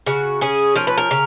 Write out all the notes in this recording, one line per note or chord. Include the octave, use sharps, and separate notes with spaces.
C#3 F#4
C#4 G#4
F3 A#4
B4
A#4
C#3